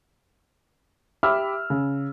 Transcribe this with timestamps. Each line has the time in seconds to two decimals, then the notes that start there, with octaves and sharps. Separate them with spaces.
1.23 G4 E5 B5 D6 E6 F6
1.70 C#3